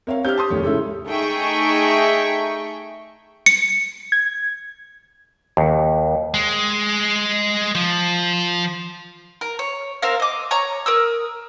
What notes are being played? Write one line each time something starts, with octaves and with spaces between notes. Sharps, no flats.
C4 A#4 C#5 E5 F5
C4 D4 G4 F6 G6
A5 C6 D#6
F1 D#2 C#5
G#2 C#3 E4 A4
A3 D#4 G#4 E5 G5 C#6
C#7
G#6
D#2
G#3
F3
A#4
C#5
C4 A#4 C5 F5
D#5 D6
C#5 A#5 C#6
A#4 D#6 E6